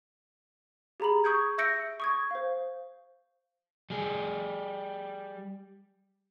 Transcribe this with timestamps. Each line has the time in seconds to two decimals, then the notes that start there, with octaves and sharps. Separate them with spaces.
1.00 G4 G#4 A#5 B5 F#7
1.24 C#6 D#6 G6 G#6
1.58 E5 E6 G6 A#6 C#7 D7
2.00 C#6 D#6 G#6
2.31 C5 F5
3.90 G3 G#4